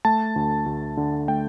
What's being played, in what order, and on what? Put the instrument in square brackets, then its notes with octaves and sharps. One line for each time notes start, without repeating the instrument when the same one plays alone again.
[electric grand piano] A3 A5
D2
D2
D3
A3 G5